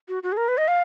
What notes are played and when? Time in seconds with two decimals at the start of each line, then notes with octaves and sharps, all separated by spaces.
0.09 F#4
0.23 F#4
0.32 G#4
0.37 A#4
0.48 B4
0.58 D#5
0.68 F5